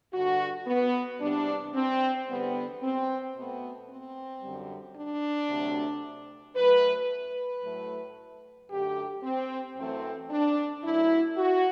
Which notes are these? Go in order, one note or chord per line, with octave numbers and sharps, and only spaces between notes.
G2 D3 G3 F#4
B3
E2 C3 G3 D4
C4
E2 D3 G3 B3
C4
B2 A3 B3
C4
F#2 D3 G3
D4
D2 C3 F#3 A3
F#2 F#3 A3 B4
B4
A2 F#3 A3
F#2 D3 A3 G4
C4
F#2 E3 A3 C4
D4
F#2 F#3 A3 E4
F#4